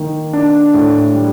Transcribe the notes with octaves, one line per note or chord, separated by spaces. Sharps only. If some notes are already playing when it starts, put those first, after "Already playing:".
Already playing: D#3 A#3
D4
A2
G3